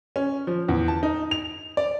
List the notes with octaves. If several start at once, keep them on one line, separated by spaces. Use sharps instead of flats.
C#4
F3
E2
A5
D#4
F7
D5